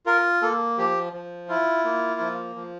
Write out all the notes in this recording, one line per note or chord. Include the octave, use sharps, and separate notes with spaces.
F4 A#4
A#3 A4
F3 G4
F3
E4 F4
A#3
F3
F3